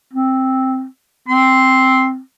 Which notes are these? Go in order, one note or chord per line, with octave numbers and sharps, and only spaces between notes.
C4
C4 C6